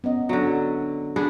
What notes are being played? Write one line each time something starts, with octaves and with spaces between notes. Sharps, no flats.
B3 C#4 D#5
D3 F#3 D5
B3 D4 G#4